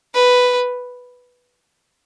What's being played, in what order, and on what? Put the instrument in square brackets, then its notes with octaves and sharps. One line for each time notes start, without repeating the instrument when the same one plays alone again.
[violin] B4